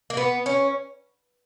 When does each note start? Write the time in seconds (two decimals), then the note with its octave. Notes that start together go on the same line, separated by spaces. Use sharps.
0.10 A#3
0.17 B3
0.46 C#4